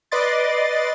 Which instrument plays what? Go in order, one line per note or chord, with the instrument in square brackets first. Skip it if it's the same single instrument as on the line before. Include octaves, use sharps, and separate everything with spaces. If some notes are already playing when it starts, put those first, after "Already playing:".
[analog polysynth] B4 D5 D#5 C6 D6 A6